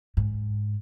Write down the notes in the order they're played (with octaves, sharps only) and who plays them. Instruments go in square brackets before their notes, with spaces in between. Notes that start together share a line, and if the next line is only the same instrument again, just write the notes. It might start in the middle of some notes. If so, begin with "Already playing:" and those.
[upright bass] G#2